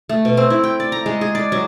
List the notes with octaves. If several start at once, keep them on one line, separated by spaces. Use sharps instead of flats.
A3
B2
C4
E4
G5
D5
A#5
G#3
G#4
D5
F#3